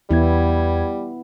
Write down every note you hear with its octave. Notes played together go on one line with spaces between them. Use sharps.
E2 G3 B3 E4 G#6